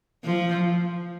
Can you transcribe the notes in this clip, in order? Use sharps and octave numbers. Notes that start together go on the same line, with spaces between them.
F3